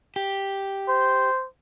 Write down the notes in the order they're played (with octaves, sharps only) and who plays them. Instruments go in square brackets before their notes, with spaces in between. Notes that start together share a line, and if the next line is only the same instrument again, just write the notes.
[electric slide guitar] G4
[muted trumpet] C5